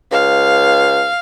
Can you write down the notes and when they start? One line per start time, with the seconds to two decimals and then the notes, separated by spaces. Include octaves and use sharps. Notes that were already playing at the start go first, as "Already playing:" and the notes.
0.12 C#2 F5